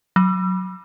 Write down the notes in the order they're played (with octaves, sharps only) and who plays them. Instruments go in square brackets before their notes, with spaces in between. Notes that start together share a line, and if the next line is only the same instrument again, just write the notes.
[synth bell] F#3